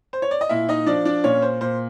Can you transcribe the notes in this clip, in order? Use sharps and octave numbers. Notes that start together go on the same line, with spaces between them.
C5
C#5
D5
D#5
A#2 E4 E5
D#4 D#5
F3 D4 D5
D4 D5
A#2 C#4 C#5
C5
A#2 C5